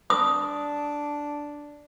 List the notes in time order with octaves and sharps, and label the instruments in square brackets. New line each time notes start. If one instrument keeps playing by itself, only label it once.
[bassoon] D4 [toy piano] D#6